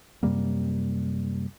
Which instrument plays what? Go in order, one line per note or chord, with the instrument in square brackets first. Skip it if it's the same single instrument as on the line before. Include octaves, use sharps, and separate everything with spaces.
[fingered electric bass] F#2 C3 G3 A#3